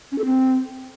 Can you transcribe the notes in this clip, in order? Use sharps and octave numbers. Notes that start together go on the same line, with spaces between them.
C#4
A4
C4